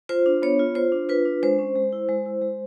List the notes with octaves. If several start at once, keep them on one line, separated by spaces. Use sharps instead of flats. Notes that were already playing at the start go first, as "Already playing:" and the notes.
F4 C5
D4
B3 C#5
F4
F4 C5
D4
F4 B4
D4
G#3 C5
C#4
G#3
E4
G#3
E4
G#3